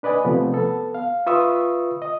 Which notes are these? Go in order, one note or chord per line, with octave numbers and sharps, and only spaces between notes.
D4 B4 D5 D#5 G#5
C3 F3 A3 B3
B3 A4
F5
F4 B4 E5 C#6 D#6 E6
D#5